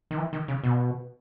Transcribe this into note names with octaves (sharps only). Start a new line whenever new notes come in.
D#3
E3
D#3
C#3
B2